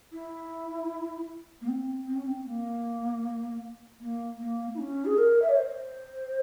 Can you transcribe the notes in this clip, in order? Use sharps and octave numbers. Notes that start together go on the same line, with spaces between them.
E4
A#3
C4
C4
C#4
C4
A#3
A#3
A#3
E4
C#4
G#4
A#4
E5
C#5
C5